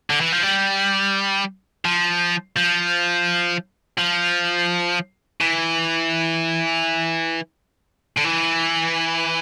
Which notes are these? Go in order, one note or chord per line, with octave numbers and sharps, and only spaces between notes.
D3
E3
F3
G3
F3
F3
F3
E3
D3
E3